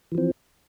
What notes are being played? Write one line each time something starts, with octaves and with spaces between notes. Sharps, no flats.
E3 F3 C4